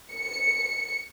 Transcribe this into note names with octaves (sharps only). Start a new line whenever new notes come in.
C#7